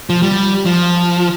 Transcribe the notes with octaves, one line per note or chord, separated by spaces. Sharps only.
F3
G3
F3